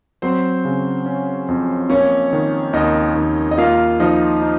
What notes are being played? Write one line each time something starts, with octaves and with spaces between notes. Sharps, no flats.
F#3 C4 C5
C#3
C#4
F2
A#3 C#4 C#5
D#3
D#2 D#4 D#5
D#2
D#5
A#3 F4 F5
F3 D#4 D#5
D#4